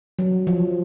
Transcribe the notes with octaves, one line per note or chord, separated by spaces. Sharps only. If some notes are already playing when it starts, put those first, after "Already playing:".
F#3
F3